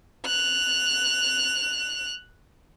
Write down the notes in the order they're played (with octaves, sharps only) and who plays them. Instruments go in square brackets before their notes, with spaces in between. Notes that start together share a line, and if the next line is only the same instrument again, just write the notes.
[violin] F#6 F7